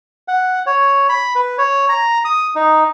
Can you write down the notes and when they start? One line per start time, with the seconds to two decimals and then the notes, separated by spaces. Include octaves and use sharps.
0.28 F#5
0.66 C#5
1.09 B5
1.35 B4
1.58 C#5
1.89 A#5
2.25 D#6
2.55 D#4